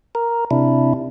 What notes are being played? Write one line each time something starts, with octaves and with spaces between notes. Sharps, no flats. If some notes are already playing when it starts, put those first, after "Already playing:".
A#4
C3 D4 E4